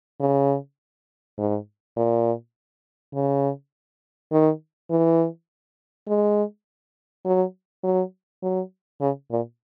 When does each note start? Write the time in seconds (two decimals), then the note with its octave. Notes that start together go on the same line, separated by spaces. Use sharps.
0.20 C#3
1.38 G#2
1.97 A#2
3.14 C#3
4.32 D#3
4.90 E3
6.08 G#3
7.26 F#3
7.84 F#3
8.43 F#3
9.01 C#3
9.31 A#2